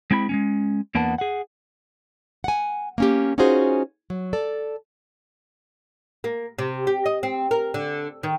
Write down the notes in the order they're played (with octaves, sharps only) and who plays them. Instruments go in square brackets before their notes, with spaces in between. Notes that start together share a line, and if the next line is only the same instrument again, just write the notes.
[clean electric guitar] G#3 C4 E4 G#5 B5
G#3 A#3 C#4
E2 A#3 B3 D4 F#5 A5
G#4 F#5
[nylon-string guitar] F#5 G#5
A#3 C#4 G4
C#4 D#4 F4 F#4 G#4 C5
F#3
A4 D5
[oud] A#3
C3
G4
D#5
C4
A#4
D3
D#3